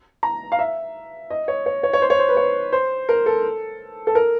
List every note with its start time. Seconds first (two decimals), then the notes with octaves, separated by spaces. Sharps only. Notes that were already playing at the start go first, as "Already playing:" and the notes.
0.23 A#5
0.52 F5
0.59 E5
1.30 D#5
1.48 C#5
1.66 C#5
1.83 C#5
1.93 C#5
2.02 C5
2.10 C#5
2.19 C5
2.28 B4
2.37 C#5
2.73 C5
3.09 A#4
3.26 A4
4.07 A4
4.15 A#4